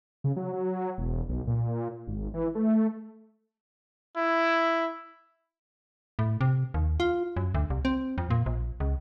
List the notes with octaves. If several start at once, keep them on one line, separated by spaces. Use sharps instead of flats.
C#3
F#3
F#3
E1
B1
A#2
G#1
E3
A3
E4
A2
C3
D#2
F4
F#2
D2
C2
C4
F2
A#2
A#1
C#2